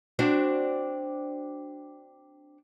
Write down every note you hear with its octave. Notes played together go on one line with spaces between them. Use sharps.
C4 D4 F#4